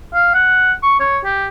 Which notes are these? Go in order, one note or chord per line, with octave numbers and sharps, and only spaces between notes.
F5
F#5
C#6
C#5
G4